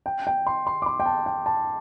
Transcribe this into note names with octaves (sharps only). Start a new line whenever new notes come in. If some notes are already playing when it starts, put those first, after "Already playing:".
G5
G5
C6
C6
D6
C6
G5
A5
G5
A5